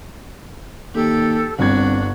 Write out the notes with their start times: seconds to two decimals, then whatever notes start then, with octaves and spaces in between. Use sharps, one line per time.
0.95 D#2 G4 A4
1.59 G1 C2 D4 F#4 G#6